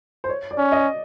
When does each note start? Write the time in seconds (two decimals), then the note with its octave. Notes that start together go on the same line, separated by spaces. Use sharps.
0.24 C5
0.29 C#5
0.51 D5
0.58 C#4
0.72 D#5